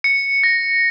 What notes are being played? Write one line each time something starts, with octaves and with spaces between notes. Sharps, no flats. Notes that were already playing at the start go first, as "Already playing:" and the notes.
C#7
A#6